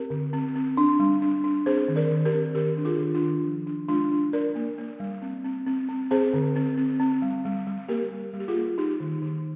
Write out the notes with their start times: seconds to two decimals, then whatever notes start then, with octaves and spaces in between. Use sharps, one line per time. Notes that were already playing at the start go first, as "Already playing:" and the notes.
Already playing: C4 G4 A#4
0.10 D3
0.33 C4
0.56 C4
0.77 D4
0.99 G3
1.22 D4
1.44 D4
1.66 C4 G#4 C5
1.88 D#3
1.96 A#4 D5
2.11 D#3
2.25 G4 A#4
2.33 C4
2.55 D#3 G4 A#4
2.77 D4
2.85 F4 G#4
2.99 D#3
3.14 D4 F4
3.22 D#3
3.45 F3
3.67 D4
3.88 G#3 D4 F4
4.11 D4
4.33 D4 A#4 D5
4.55 A#3
4.78 A#3
5.00 G3
5.22 C4
5.45 C4
5.66 C4
5.89 C4
6.11 C4 G#4 C5
6.33 D3
6.56 C4
6.78 C4
7.00 C4
7.22 G3
7.45 G3
7.67 G3
7.88 A#3 G4 A#4
8.12 G3
8.33 G3
8.40 G4
8.48 F4 G#4
8.55 A#3
8.78 A#3 D#4 G4
9.00 D#3
9.22 D#3